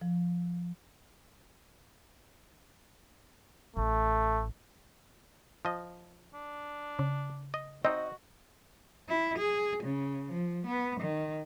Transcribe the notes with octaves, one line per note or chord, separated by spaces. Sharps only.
F3
A1 A3
F3 D#5
D4
C#3
D#5
C4 D#4 F#4 D#5
E4
G#4
C#3
F3
B3
D#3